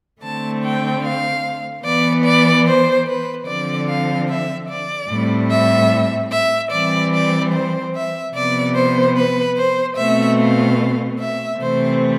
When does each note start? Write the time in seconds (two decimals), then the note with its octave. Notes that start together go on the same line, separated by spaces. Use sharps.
0.22 D3 A3 C4 A5
0.62 G5
1.03 F5
1.84 E3 B3 D5
2.24 D5
2.66 C5
3.06 B4
3.47 D3 F3 C4 D5
3.87 F5
4.28 E5
4.68 D5
5.09 A2 G3 C4
5.50 E5
6.31 E5
6.71 E3 G3 C4 D5
7.13 D5
7.52 C5
7.93 E5
8.33 C3 F3 B3 D5
8.75 C5
9.16 B4
9.56 C5
9.96 B2 A3 C4 E5
10.37 F5
11.18 E5
11.59 C3 E3 A3 C4 C5